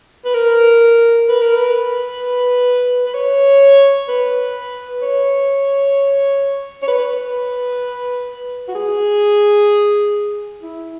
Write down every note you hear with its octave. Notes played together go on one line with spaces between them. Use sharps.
B4
A#4
B4
A#4
B4
B4
C#5
B4
C#5
C#5
B4
F#4
G#4
E4